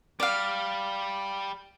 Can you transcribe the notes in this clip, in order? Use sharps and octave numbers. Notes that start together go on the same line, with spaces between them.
G3 D5 F5